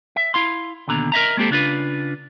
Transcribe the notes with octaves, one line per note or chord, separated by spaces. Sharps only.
E5
E4 F5 C6
D#2 B2 D3 A#5
A#4 D#5 E5 A#5
G#3 A#3 C4 G4 A4
C#3 D4 F4 B4